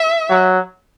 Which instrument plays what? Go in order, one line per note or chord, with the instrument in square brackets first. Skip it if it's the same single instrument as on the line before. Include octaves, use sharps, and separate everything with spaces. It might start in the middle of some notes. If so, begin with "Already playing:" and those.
Already playing: [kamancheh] E5
[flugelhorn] F#3